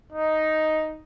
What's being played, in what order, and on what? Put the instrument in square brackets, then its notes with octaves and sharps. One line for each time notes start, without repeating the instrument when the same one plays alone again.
[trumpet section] D#4